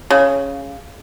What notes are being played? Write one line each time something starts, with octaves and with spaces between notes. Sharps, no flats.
C#3